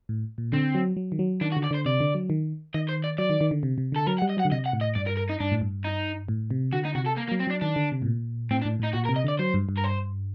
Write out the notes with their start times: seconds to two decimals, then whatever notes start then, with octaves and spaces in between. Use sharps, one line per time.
0.09 A2
0.38 A#2
0.52 D3 C4
0.75 F#3
0.97 F#3
1.12 D#3
1.19 F#3
1.41 D#3 D4
1.52 F#4
1.57 D3
1.64 D5
1.71 D3 C5
1.86 C3 D5
2.00 D3
2.15 F#3
2.30 D#3
2.74 D#3 D#5
2.89 C5
3.04 D5
3.18 F#3 D5
3.30 D#3
3.41 D#3
3.51 D3
3.63 C3
3.78 C3
3.92 D3 A4
4.07 F#3 A#4
4.19 F#5
4.22 G3
4.30 D#5
4.37 F#3 F#5
4.45 D3
4.52 C3 D#5
4.66 F#5
4.73 A2
4.81 D#5
4.95 G2 D5
5.07 A#4
5.17 A#4
5.30 D#4
5.40 G2 D4
5.52 A2
5.61 G2
5.84 D#4
6.28 A2
6.51 C3
6.72 D3 F#4
6.85 D#4
6.95 C3 F#4
7.06 A4
7.17 A#3
7.28 A#3
7.32 F#3
7.39 C4
7.47 F#3 D4
7.61 D#3 D4
7.76 D3
7.92 C3
8.02 A2
8.06 A#2
8.51 A2 C4
8.62 D4
8.65 A2
8.80 A2 D#4
8.94 A#2 F#4
9.06 A#4
9.09 C3
9.16 D#5
9.24 D3 D5
9.39 F#3 C5
9.54 G2
9.69 G2
9.77 A#4
9.84 C5